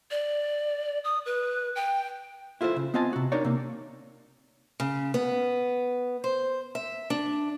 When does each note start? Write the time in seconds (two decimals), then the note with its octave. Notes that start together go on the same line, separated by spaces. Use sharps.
0.11 D5
1.04 D#6
1.26 B4
1.76 G5
2.61 E4 F4 A4 A#4 C5
2.76 C#3
2.94 B3 C4 F4 D#5 G#5 A5
3.13 C3 F#4
3.32 D4 D#4 A#4 C#5 D5
3.45 C3 A#3
4.80 C#3
5.14 B3
6.24 C5
6.75 E5
7.10 D4